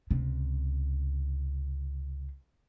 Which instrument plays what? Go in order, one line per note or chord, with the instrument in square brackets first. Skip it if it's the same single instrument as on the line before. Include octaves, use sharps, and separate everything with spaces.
[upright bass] C#2 C3